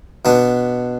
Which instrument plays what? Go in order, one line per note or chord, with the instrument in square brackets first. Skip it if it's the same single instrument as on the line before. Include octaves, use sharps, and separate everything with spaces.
[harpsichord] B2 B3 D4